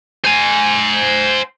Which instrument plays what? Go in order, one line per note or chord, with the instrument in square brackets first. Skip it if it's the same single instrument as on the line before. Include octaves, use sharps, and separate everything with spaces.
[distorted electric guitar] C5 G#5